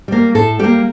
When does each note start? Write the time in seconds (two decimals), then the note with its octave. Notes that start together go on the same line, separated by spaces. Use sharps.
0.08 G3 A#3
0.35 A2 A4
0.59 G3 A#3 G4